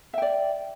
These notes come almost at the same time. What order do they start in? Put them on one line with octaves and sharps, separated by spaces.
E5 G5 D5